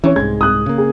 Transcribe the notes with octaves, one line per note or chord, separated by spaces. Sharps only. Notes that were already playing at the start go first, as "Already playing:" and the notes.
E3 C#4 C#5
C2 G#2 G#3 G#6
D#6 F#6
C#3 A#3
G#4